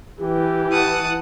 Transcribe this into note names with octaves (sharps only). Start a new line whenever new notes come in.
E3 G4
F#5 A5 D#6